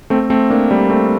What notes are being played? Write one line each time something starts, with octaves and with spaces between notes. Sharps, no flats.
A3 C4
A3 C4
A#3 D4
G3 A#3
A3 C4